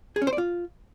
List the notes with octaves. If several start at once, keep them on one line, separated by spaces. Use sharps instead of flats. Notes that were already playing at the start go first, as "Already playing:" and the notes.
G#4
C#4
C5
D5
F4